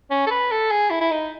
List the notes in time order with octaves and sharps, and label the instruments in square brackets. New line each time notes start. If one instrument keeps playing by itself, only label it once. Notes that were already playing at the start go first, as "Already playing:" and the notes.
[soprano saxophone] C#4
A4
B4
A4
G#4
E4
E4
D#4